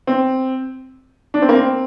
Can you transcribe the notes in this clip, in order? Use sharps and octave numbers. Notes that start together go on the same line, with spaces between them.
C4
D4
C4
A#3
C4